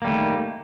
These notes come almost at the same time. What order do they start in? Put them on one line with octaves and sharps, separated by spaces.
A#3 G3 A3 D#3